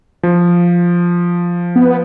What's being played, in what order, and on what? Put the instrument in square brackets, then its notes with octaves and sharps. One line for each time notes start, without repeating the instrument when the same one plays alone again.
[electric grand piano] F3
[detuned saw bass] B3